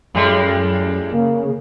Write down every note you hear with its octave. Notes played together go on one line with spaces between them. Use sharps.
F#2 A2 G3 G#3
C#3 A#3